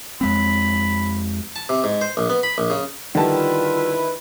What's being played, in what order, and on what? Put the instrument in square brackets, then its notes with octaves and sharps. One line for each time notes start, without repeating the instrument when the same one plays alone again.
[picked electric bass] F2 G#3 C4 [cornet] B5
[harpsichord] A5
C3
G#2
C5
A#1
B3
B5
A#1
C#3
[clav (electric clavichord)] D3 G3 [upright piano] D#3 A5 [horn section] E4 B4 [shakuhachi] F4